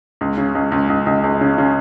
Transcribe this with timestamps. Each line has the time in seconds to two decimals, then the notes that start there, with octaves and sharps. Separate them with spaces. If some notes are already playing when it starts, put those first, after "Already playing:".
0.21 C#2
0.38 C#3
0.55 C#2
0.72 C#2
0.90 C#2
1.06 C#2
1.24 C#2
1.41 C#3
1.58 C#3